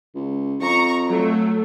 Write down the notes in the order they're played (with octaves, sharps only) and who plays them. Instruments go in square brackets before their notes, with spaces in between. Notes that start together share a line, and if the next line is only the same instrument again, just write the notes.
[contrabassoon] C#2
[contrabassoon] F2 [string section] A#5 C#6
[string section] F#3 A3